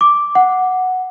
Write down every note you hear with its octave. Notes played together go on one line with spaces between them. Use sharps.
D6
F#5